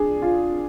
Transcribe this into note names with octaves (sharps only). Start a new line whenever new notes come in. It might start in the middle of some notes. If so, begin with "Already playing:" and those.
Already playing: D4 G#4
F4